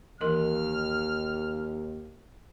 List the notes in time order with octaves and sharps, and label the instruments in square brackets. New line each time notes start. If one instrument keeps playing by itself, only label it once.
[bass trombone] D#2 [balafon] E3 A#4 D#5 [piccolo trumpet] F6